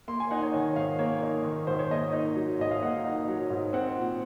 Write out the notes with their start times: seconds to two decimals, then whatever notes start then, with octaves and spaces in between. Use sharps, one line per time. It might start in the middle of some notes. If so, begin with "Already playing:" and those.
0.08 A#3 C6
0.20 G#5
0.31 D#4 F#5
0.42 C#5
0.53 D#3 C#5
0.76 G#2 F5
0.99 A#3 C#5
1.22 D#4
1.44 D#3
1.67 G#2 C5
1.79 C#5
1.91 A#3 D#5
2.13 D#4
2.36 F#3
2.59 G#2 D#5
2.71 F5
2.83 A#3 F#5
3.04 D#4
3.28 F#3
3.50 G#2
3.73 C4 F#5
3.97 A#2